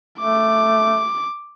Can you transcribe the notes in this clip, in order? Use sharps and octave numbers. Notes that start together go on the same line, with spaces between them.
A3 D6